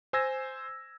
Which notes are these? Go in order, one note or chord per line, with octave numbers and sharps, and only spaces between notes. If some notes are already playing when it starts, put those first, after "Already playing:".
C5 G#5 E6 G#6 A#6